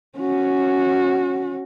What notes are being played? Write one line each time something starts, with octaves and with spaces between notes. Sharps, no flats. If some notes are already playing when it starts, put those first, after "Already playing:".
C#4 F#4